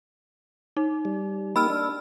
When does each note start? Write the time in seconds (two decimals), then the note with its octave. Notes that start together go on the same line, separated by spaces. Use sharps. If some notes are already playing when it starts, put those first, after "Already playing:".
0.77 D#4
1.05 G3
1.56 A#3 D#4 G4 B5 E6 F6
1.70 D4